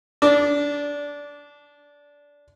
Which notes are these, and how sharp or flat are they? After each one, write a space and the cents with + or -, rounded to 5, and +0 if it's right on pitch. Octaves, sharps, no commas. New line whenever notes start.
D4 -20 D5 +0